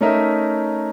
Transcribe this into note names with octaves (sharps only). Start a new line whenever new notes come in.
A3 C#4 D#4 A#4 D#5 E5